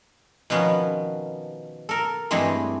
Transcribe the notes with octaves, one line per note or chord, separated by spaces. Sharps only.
B2 D#3 F3 B3 C#4
A4 A#4
G2 E3 G#3 A3 C4